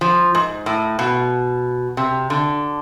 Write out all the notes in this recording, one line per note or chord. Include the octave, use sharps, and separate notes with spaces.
F3
G#2
A2
B2
C3
D3